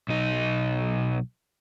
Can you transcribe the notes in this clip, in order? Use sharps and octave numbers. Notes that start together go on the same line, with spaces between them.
B1 D#4